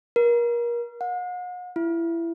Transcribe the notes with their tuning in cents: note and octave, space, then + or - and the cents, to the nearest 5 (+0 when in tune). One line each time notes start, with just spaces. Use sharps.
A#4 +30
F#5 -45
E4 +20